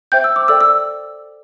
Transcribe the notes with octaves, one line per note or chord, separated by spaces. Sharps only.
C5 E5 G5 G6
E6
D6
A4 D5 G5 E6
E6